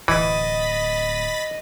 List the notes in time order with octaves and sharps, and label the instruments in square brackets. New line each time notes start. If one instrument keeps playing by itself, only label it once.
[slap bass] D1 [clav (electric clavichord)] E3 [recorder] D#5 [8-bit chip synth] B5 A6 B6